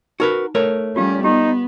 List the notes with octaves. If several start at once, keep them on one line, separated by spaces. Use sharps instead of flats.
D#4 F#4 A#4 B4
A3 A#4 C#5
G3 C#4 F4 G4 F5
B3 D#4 G4